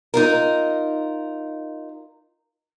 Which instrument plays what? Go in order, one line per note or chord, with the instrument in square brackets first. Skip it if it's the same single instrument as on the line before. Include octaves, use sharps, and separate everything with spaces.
[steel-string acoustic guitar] D#4 F4 A#4